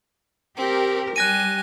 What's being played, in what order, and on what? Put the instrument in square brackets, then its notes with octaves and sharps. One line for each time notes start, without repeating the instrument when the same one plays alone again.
[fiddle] C4 [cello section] G4 A#4
[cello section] G3 [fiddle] G4 G#5 [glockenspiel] F#6 A#6 D#7